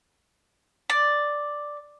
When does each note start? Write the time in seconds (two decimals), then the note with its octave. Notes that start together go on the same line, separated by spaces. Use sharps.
0.90 D5